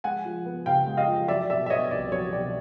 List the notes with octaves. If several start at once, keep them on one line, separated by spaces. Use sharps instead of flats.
G#3 F#5 G#5
F3
B3
C#3 F5 G5
G#3
D#5 F5
F3
F#3 D5 E5
B2 D5 E5
E5
B3 C#5 D#5
C2 D5
F#3 C#5
B2 D5